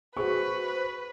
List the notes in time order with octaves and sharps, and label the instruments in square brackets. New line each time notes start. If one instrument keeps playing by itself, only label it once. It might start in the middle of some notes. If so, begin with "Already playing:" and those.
[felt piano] F#4 G#4 C#6 [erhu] B4 [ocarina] C5